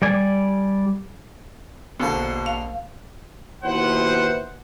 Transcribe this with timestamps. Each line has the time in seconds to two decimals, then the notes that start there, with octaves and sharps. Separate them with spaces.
0.02 G3 D5 G#5
2.00 A#1 B2 D3 A#3 C5
2.46 F5
3.64 D#2 B2 E4 B4 C5 F#5